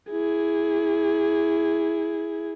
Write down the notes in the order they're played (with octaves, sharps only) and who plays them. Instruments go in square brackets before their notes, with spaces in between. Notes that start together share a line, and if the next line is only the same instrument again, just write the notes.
[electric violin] E4 G#4